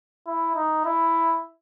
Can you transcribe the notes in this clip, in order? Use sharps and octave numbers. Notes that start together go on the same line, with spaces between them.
E4
D#4
E4